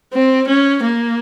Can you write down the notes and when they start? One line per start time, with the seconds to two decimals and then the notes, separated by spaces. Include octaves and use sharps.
0.13 C4
0.48 C#4
0.82 A#3